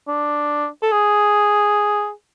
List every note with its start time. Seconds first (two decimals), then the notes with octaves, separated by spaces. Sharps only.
0.08 D4
0.83 A4
0.92 G#4